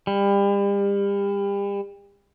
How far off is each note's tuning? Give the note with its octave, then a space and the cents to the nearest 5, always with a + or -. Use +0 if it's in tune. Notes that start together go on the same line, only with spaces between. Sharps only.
G3 +35